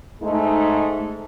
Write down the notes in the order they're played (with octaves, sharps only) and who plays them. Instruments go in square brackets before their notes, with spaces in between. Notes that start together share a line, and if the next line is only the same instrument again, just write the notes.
[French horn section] G#2 G#3 A3 D#4